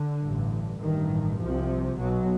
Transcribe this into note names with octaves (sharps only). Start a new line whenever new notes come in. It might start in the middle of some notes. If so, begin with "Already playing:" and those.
Already playing: D3
A1 G2
A1 G2 D#3
C2 C3 F3
B1 B2 F#3